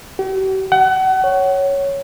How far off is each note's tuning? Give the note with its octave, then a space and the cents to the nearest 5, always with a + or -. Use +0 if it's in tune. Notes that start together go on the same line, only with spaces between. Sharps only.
G4 -45
F#5 +30
C#5 +0